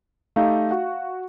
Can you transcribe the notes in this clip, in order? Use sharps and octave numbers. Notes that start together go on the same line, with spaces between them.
A3 D#4 G4 F5
F#4 F#5